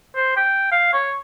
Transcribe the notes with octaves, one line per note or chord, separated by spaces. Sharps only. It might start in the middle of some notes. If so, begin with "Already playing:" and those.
C5
G5
F5
C#5